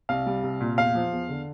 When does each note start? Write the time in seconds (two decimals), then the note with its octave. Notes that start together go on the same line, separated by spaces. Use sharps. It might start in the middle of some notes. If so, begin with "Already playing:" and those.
0.09 C2 F5
0.26 G3
0.44 C2
0.61 A#2
0.78 E2 F5
0.95 F3
1.12 E2
1.29 D3